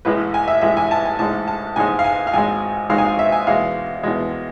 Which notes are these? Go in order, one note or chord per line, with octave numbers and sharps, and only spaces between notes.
A1 A2 G#3 B4
G#5
E5
A1 A2 G#3 E5
G#5
A5
G#5
A1 G#2 G#3 A5
A5
A1 G#2 G#3 G#5
F5
G#5
F5
G#1 G#2 G#3 G#5
G#1 G#2 G#3 F5
G#5
F5
E5
G#5
E2 B2 G#3 F5
E2 B2 G#3